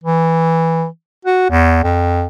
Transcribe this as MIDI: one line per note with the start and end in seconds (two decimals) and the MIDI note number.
0.04 0.86 52
1.25 1.48 66
1.50 1.79 40
1.84 2.27 41